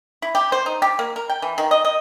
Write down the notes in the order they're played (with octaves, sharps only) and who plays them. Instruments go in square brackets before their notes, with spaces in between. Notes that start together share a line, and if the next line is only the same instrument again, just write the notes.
[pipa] E4
G4
C5
D#4
G4
A#3
A#4
G5
E3
D#3
D#5
D#5